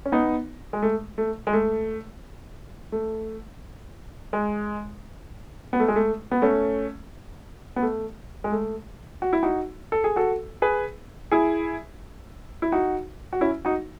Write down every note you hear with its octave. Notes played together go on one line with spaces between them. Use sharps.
C#4
B3 D#4
G#3
A3
A3
G#3
A3
A3
G#3
B3
A3
G#3
A3
B3
A3 C#4
B3
A3
G#3
A3
F#4
E4
D#4 F#4
A4
G#4
F#4 A4
G#4 B4
E4 G#4
E4
D#4 F#4
F#4
C#4 E4
D#4 F#4